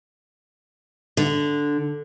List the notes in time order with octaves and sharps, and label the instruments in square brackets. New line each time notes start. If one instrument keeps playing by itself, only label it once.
[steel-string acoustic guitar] D3